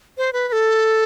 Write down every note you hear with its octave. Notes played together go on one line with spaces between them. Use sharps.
C5
B4
B4
A4